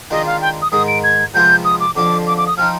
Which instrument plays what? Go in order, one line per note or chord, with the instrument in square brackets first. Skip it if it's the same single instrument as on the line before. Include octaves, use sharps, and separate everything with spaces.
[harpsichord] D#3 G#3 D4 F4 [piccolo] D#5
[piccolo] F5
G5
D#6
[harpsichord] G#2 D#3 G#3 [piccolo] D#6
[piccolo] D7
G#6
[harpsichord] C3 F3 G#3 B3 F4 [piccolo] G6
[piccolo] D#6
D6
[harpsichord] F2 D3 F3 [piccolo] D6
[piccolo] D6
D6
D#6
[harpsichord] F3 C4 D#4 [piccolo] F6